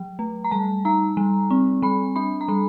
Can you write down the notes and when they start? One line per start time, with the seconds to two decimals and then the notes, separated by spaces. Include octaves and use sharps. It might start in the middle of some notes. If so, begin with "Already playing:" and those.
Already playing: F#3
0.19 A3
0.44 A#5
0.51 G3 A5
0.85 D#4 A#5
1.17 G3
1.50 C4
1.82 G3 B5
2.16 D4 B5
2.41 A#5
2.48 G3 B5